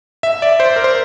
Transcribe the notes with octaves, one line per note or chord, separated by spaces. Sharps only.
E5
D5
C5
A#4
C5